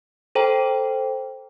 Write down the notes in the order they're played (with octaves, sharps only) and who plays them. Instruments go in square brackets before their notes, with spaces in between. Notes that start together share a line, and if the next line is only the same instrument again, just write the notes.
[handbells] A4 C5 G5 A#5